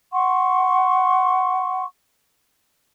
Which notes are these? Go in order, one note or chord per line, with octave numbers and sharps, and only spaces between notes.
F#5 C6 C#6